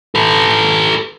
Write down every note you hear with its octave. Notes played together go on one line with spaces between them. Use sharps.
A4 B4